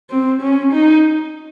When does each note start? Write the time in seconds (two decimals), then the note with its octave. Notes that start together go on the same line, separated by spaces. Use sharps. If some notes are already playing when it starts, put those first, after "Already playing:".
0.10 C4
0.41 C#4
0.72 D#4